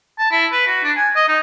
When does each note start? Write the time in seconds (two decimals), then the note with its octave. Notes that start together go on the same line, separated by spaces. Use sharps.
0.18 A5
0.31 E4
0.52 B4
0.67 F#4
0.84 D4
0.96 G#5
1.15 D#5
1.28 D#4